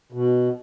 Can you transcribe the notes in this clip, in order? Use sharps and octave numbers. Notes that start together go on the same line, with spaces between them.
B2